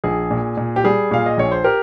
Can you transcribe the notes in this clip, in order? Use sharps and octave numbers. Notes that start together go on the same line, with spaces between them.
A#1 G#4
A#2
A#2
G4
G3 G#4
A#2 F5
D#5
A#1 C#5
C5
G4 A#4